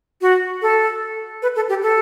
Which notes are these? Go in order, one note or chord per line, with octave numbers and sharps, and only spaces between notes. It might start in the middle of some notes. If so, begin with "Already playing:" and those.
F#4
A4
B4
A4
G4
A4